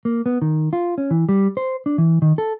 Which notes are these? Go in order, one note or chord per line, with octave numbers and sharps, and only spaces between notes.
A#3
B3
D#3
F4
C#4
E3
G3
C5
D4
E3
D#3
A4